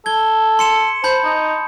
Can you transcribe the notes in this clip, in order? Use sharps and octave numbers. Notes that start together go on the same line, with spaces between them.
A4 G#6 G7
C6 C#7 E7
C5 A5 B5 G6
D#4